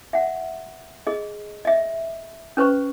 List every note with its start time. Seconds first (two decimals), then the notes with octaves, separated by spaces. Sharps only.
0.13 E5 F#5
1.07 G#4 D#5
1.65 D#5 E5
2.57 C#4 B4 C5 C#6